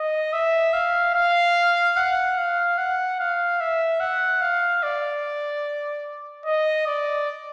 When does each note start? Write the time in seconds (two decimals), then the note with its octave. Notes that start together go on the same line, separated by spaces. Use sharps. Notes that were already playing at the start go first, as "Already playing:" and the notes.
Already playing: D#5
0.33 E5
0.73 F5
1.14 F5
1.97 F#5
2.37 F5
2.78 F#5
3.19 F5
3.60 E5
4.00 F#5
4.42 F5
4.83 D5
6.46 D#5
6.87 D5